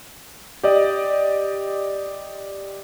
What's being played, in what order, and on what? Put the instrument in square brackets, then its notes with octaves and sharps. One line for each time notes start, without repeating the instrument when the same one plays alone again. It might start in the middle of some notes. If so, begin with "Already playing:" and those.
[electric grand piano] G4 D5 D#5